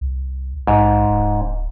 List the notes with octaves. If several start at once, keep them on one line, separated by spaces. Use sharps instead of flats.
C2
A#1 G#2
D1